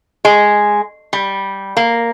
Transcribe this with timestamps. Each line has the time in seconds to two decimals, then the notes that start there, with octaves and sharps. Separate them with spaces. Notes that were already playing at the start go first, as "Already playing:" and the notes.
0.25 G#3
1.13 G3
1.77 A#3